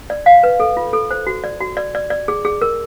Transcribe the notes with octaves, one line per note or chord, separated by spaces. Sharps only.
D5
F5
B4
A4
F4
A4
C5
F#4
D5
F#4
D5
D5
D5
G#4
G#4
A#4